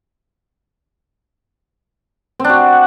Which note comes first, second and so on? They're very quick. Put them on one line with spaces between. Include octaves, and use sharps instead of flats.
C4 D4 F#4